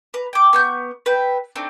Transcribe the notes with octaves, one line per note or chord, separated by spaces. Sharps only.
B4 A#5
G5 D6
B3 C#6 G6
B4 E5 G5
A3 C4 D4 D#4